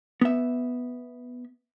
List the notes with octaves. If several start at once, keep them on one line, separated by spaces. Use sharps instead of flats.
B3 E5